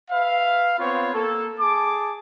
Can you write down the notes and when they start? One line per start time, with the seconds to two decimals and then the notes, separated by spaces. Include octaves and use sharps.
0.10 B4 E5 F5
0.79 B3 C4 F4 B4 C#5
1.14 A#3 A4
1.60 G#4 A5 D6